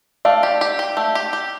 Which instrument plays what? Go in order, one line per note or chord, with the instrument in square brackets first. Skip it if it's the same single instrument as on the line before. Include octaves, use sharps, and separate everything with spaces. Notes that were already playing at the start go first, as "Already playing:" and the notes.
[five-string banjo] A3 [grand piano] D5 F5
[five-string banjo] G4
G4
G4
A3
G4
G4